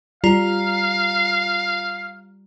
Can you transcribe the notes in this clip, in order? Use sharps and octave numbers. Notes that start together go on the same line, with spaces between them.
G3 F4 F5 A#5